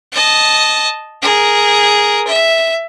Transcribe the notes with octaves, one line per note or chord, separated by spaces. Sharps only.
D#5 A5
G#4 A#4
E5